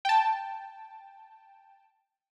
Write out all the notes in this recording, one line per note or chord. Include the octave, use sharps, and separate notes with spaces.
G5 A5